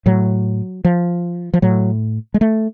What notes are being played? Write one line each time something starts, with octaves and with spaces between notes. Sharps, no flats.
A2 F#3
F3
F3
A2 F#3
G#3
A3